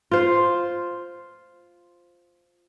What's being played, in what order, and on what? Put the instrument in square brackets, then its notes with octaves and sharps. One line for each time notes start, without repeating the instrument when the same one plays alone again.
[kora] F4 C5